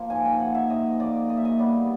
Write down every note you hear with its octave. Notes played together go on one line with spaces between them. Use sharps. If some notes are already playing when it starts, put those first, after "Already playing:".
Already playing: F3 A#3
G#2 G#5
G5
F3 A#3 F#5
E5
G#2 D#5
F3 A#3 D5
A#2 D#5
E5
D#5
G3 B3 D5